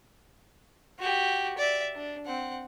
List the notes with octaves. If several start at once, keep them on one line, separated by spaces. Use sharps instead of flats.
F#4 G4
D5 E5
D4
C4 F#5